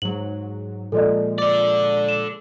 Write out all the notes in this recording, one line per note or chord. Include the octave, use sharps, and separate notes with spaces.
G#2 F#3 F#7
A#2 F3 G#3 A4 D5 D#5
A4 D5 D6
E7